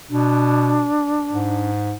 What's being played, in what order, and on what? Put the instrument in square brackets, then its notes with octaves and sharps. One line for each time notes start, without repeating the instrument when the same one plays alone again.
[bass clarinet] B2 [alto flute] D4
[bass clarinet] G#2